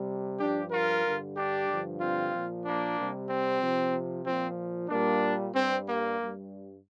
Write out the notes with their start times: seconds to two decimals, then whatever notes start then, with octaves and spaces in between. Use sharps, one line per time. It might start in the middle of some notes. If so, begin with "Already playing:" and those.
Already playing: C3 G3
0.40 G2 F3 D4 G4
0.71 F4 A#4
1.03 G2 D3 G3
1.36 D4 G4
1.68 G2 D3 F3
2.00 C4 F4
2.32 A#2 F3
2.64 A#3 D4
2.97 C3 G3
3.29 C4
3.61 C3 F3
4.25 A#2 F3 C4
4.89 A#2 G3 A#3 D4
5.53 G2 G3 C4
5.86 A#3
6.18 G2 G3